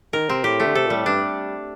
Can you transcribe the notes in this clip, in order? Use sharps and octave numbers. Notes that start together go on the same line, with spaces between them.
D#3 A#4
C3 C4
A2 G4
A3
D3
C3 A4
A#2 G3
A2
G2 D4